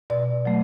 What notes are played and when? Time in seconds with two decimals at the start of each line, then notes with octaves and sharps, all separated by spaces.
0.10 B2 D5
0.45 F#3 A3